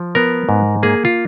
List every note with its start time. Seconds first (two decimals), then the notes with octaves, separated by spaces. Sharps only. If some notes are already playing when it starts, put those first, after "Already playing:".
Already playing: F3
0.15 B3 A#4
0.49 G#2
0.83 A#3 G#4
1.05 F4